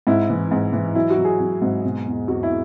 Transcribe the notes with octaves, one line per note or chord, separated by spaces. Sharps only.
G#2 E4
E3
G#2
E3
F#3 E4
F#4
F#3
G#4
F#3
G#2
B2
E2
E2 F#4
E4